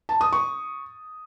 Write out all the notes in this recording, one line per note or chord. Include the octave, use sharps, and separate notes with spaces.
A5
D#6
C#6